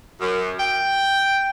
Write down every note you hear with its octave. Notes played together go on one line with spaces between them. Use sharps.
F#2
G5